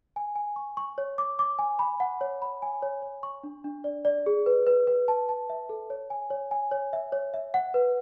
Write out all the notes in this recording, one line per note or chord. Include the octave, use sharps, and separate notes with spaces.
G#5
G#5
C#6
C#6
C#5
D6
D6
G#5
B5
F#5
C#5
B5
G#5
C#5
C#5
C#6
D4
D4
D5
D5
G#4
B4
B4
B4
A5
A5
E5
A4
C#5
G#5
C#5
G#5
C#5
E5
C#5
E5
F#5
B4